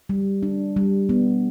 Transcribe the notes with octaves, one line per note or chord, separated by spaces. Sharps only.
G3
D4
G3
B3